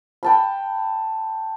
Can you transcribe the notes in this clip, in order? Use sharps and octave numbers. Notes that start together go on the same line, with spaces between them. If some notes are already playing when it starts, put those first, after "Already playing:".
G5 A5 B5